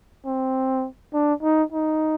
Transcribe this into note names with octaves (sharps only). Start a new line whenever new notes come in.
C4
D4
D#4
D#4